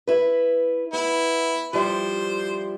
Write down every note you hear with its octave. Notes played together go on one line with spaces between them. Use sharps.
E4 B4
B3 E4
F3 G3 E4 C5